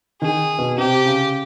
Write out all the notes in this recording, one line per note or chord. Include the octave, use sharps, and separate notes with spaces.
D#3 G#4
B2
C3 G4
C#3